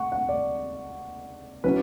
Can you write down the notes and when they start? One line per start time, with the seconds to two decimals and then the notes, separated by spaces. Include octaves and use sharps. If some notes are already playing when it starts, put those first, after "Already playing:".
Already playing: F#5 C#6
0.12 F#5
0.29 D5
1.64 F#3 C#4 E4 B4